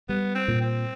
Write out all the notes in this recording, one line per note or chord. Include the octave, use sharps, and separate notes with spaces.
G3 B3
C4
A#2
C4